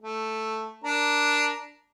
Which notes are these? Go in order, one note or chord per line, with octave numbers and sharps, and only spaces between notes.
A3
D4 A#4